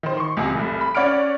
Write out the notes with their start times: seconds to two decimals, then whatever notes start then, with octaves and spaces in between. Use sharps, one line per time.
0.03 D#3 C5
0.17 C6 C#6
0.37 C#2 C3 G#3 G#4
0.55 F1 C2
0.81 B5
0.95 C#4 C#5 D5 F#5 F6 D7